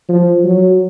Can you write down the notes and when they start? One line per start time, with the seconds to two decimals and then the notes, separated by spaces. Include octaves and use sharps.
0.09 F3
0.45 F#3